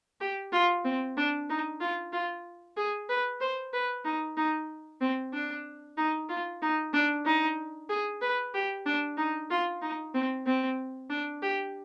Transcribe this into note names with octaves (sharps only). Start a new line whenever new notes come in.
G4
F4
C4
D4
D#4
F4
F4
G#4
B4
C5
B4
D#4
D#4
C4
D4
D#4
F4
D#4
D4
D#4
G#4
B4
G4
D4
D#4
F4
D#4
C4
C4
D4
G4